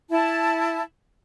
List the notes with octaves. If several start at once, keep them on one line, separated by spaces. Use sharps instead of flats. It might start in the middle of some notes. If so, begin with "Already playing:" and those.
E4 A5